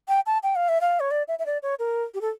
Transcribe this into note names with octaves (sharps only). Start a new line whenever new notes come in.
G5
A5
G5
F5
E5
F5
C#5
D5
E5
E5
D5
C#5
A#4
G4
A4